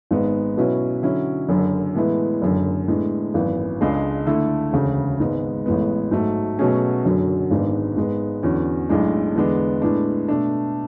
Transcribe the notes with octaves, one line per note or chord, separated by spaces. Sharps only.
G#1 G#2 G#3 B3
B2 F#3 C#4 E4 B4
D3 F#3 C#4 E4
F#1 F#2 D3
A2 E3 G#3 B3 E4
F#1 F#2 D3
A2 G#3 B3 D4
G#1 F#2 E3 B3
C#2 C#3 G#3 D4 G#4
D3 A3 E4 A4
E1 D2 C#3
G#1 G#2 G#3 B3
A1 A2 G#3 B3
G#2 F#3 A3
B2 F#3 A3 C#4 G#4
F#1 F#2 D3 F#3
G#1 G#2 G#3 B3 D4
G#2 G#3 B3
E2 D3 F#3 C#4
B1 A2 G#3 D4
E2 D3 G#3 B3 D4
A2 G#3 B3 D4
B2 A3 D4